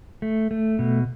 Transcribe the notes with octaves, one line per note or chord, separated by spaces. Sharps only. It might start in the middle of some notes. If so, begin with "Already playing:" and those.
A3
A3
B2